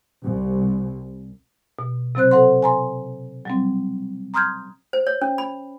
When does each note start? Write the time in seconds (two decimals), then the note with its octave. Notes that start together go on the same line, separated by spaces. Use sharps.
0.24 C2
1.79 B2
2.15 C3 F#3 C4 C5 F#6
2.31 A4 C5 F#5 C6
2.63 G#5 A#5 C6
3.45 F#3 G3 C4
4.34 A#5 C6 D#6 F6 G6 G#6
4.93 C5
5.07 C#5
5.22 C#4
5.38 B5